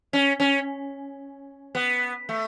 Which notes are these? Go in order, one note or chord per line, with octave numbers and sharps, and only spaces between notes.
C#4
C#4
B3
A3